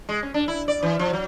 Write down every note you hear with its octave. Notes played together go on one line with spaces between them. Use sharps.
G#3
C#4
D4
E4
D5
E3
F3
F#3